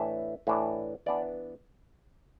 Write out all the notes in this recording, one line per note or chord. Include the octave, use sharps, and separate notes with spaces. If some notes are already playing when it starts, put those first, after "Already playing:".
Already playing: A2 E3 A3 D4 E5
A2 E3 A3 D4
E3 B3 D4 D5